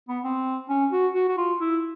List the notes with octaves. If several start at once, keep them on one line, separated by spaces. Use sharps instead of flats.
B3
C4
C#4
F#4
F#4
F#4
F4
E4